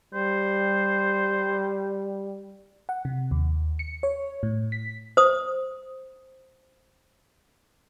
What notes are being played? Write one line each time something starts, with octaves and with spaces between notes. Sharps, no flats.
G3 C5
F#5
C3
D#2
C#7
C#5
A2
B6
C5 D#6